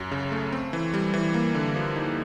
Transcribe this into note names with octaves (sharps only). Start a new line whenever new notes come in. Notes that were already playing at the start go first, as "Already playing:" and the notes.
Already playing: F#2 F#3
C#3
A3
C4
E3
G3
E3
A#3
D3
F3
D#4